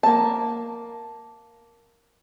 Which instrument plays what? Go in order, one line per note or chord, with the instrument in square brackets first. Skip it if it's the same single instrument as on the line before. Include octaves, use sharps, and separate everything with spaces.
[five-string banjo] A#3 A5